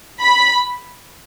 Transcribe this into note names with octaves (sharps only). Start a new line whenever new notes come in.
B5